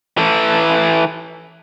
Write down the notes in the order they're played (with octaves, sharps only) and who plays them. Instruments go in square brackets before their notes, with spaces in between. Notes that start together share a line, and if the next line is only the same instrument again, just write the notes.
[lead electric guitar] E3 A4